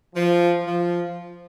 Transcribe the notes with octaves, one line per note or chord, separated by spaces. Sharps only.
F3
F3